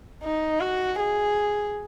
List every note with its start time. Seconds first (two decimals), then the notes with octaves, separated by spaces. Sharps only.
0.23 D#4
0.61 F#4
0.99 G#4